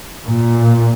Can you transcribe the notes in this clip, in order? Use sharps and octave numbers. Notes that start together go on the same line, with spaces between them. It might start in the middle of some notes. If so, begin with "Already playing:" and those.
A#2